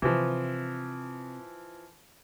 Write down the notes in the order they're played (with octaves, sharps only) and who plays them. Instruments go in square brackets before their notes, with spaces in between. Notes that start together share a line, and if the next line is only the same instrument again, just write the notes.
[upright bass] C3 [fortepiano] E3 F3